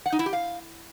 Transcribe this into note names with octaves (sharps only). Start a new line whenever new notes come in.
F#5
D#4
E4
G4
F5